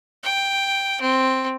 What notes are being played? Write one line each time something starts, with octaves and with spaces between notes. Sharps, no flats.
G5
C4